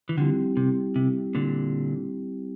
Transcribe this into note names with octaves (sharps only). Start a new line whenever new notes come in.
E3
D3 F3 G3 C4 E4 G4
C3
C3
A#2 D3